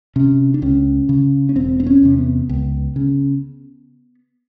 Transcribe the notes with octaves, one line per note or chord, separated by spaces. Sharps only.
C3 C#4
D4
C#2 C#4
C#3
C#4
E1 C4
C4
C#4
E2 C3
B3
C#2
C#3